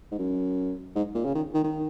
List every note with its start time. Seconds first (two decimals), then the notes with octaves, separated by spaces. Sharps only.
0.12 G#2
0.18 F#2
0.95 G#2
1.15 A#2
1.25 C#3
1.35 D#3
1.54 D#3
1.64 D#3